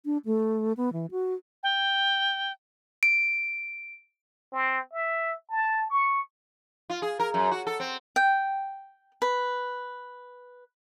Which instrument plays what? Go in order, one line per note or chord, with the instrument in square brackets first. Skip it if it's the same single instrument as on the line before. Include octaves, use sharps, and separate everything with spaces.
[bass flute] D4
A3
B3
E3
F#4
[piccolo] G5
[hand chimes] D7
[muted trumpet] C4
E5
A5
C#6
[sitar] F4
G#4
A#4
F#2
F#4
A4
C4
[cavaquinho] G5
B4